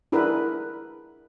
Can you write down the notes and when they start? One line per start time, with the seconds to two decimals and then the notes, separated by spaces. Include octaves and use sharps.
0.12 D4 E4 G#4 A#4 B4